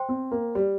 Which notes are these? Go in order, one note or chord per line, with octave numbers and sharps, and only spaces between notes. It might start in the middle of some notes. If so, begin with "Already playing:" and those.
Already playing: C5 G5 C6
C4
A#3
G3